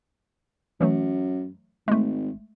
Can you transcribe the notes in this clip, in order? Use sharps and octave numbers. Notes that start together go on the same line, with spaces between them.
F#2 E3 F#3 A3
G#1 G#3 A3